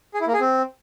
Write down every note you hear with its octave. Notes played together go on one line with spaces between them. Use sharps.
G#4
E4
A#3
G#4
C4